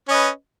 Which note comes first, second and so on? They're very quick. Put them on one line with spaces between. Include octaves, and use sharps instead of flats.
C#4 D#5 B4